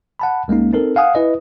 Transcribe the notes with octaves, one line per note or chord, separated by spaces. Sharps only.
F#5 A5 B5
C2 G#3 A#3 C#4 D#4
C4 D#4 A4 A#4
F5 F#5 G#5 D#6
E4 B4 D#5